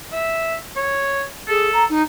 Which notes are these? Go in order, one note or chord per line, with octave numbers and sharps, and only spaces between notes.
E5
C#5
G#4 A4
A#5
D#4